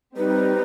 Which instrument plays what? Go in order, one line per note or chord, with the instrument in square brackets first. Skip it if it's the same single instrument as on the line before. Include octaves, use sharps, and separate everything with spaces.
[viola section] G3 C4 D#4 [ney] B4